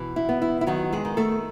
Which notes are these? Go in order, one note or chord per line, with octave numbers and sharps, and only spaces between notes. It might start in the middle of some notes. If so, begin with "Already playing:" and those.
Already playing: B2 E3
E4
B3
E4
E4
D#3 F#3 F#4
G#3 G#4
D#3
A3 A4